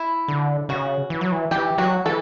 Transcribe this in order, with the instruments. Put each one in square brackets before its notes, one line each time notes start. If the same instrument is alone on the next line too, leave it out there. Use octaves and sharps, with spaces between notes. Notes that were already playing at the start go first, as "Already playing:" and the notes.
Already playing: [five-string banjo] E4
[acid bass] D3
[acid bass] C#3 [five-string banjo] F#4
[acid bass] E3
F#3
E3
[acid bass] E3 [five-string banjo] G4
[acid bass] F#3 [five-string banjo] F#4
[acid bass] E3 [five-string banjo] A4